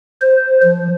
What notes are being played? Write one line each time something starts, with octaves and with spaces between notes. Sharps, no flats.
C5
F3